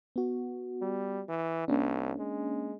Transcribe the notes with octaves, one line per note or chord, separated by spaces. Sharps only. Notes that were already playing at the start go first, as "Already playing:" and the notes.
B3 F#4
G3
E3
C2 A#3 C#4 D4
G#3